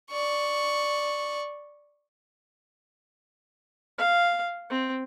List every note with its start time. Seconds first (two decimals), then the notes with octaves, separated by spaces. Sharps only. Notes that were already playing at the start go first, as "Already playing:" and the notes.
0.11 D5 C#6
3.98 F5
4.70 C4